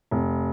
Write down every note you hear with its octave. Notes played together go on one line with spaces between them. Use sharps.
F1